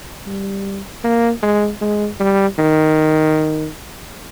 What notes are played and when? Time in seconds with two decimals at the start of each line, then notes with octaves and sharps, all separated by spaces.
0.26 G3
1.04 A#3
1.42 G#3
1.81 G#3
2.20 G3
2.58 D#3